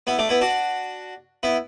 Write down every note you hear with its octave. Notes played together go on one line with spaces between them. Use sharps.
B3 E4
A3 D4
B3 E4
D4 F#4
B3 E4